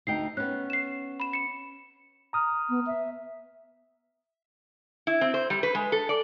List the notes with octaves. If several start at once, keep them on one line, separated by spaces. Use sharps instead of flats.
D2 D#4 G5 C7
B3 C#4 F#6
C7 E7
B5 E7
C#7 E7
A#5 D#6 F6
B3
E5
E4
C4
C5
G3
B4
G#3
A4
D5